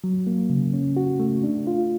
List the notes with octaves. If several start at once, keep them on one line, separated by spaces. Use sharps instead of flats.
F#3
A#3
C#3
C#4
F#4
A3
D4
F4